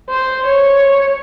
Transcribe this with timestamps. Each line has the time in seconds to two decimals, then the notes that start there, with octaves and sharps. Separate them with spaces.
0.09 C5
0.46 C#5